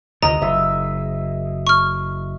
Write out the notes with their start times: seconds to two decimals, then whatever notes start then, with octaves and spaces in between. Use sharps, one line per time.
0.23 D2 C3 D#3 D#5 A#5
0.42 F#1 E5
1.67 C#6 F6